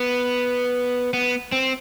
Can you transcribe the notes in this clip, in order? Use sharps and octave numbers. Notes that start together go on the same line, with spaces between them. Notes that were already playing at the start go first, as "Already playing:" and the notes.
Already playing: B3
B3
C4